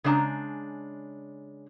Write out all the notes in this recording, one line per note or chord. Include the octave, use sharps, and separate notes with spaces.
C#3 G#3 D4 A5 A#5